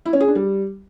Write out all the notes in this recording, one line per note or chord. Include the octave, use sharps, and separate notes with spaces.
E4
C#4
G#4
D4
G3